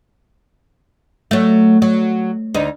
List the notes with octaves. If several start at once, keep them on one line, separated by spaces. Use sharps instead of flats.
F#3 A3
F#3
D2 D#4